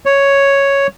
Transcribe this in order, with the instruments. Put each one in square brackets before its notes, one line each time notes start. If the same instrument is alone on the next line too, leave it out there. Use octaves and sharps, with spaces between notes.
[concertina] C#5